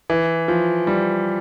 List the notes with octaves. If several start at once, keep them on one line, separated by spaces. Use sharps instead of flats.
E3
F3
G3